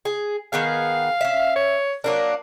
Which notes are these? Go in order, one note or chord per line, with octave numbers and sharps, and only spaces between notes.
G#4
D#3 B3 G#4 F5
C#4 E5
C#5
F#3 A#3 D4 A#4